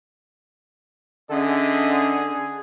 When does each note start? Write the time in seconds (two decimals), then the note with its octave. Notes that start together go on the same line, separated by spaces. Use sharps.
1.31 D3 C#4 G#4 D#5 E5